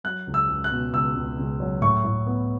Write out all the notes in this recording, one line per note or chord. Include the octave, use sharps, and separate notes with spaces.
F#3 F#6
C#2
E6
C#2
F#6
B2
C#2 E6
C#2
C#2
F#3
A2 C#6
A2
B3